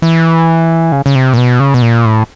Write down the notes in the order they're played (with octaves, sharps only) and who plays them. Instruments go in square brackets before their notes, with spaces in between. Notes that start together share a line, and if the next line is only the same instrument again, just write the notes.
[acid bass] E3
C#3
C#3
C3
A#2
B2
C#3
B2
A#2
A2